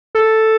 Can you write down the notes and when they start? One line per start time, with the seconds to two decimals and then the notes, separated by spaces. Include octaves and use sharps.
0.15 A4